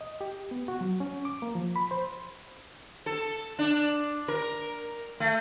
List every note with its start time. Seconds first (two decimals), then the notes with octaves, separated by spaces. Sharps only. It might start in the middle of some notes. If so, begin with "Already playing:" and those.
0.01 D#5
0.21 G4
0.51 B3
0.68 F#4
0.81 F#3
1.00 C#4
1.25 D6
1.42 A#3
1.55 F3
1.76 B5
1.91 C5
3.06 A4
3.59 D4
4.28 A#4
5.20 A3